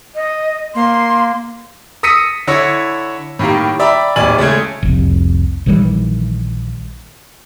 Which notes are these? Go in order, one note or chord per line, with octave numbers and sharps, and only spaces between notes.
D#5
A#3 C6
D#6 E6 A#6 B6 C#7 D#7
D3 E4 C#5 A#6 C#7
A2 D#3 G3 A#3
D5 E5 G5 A#5 B5
D1 D#2 D5 G#5 F#7
C#3 G#3 A3 G#6
F1 C2
A#1 D#3 E3 G3